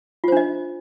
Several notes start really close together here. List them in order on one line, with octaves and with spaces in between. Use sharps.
F4 C5 D4 D#5